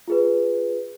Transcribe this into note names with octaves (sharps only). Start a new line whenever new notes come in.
F4 G#4 B4